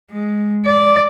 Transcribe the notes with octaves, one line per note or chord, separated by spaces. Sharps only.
G#3
D5